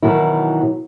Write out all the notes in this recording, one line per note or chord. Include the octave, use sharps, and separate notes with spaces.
B2 D#3 E3 F#3 E4